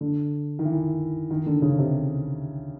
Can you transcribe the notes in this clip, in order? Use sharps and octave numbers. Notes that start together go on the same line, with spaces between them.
D3
D#3
E3
D#3
D3
C#3
C3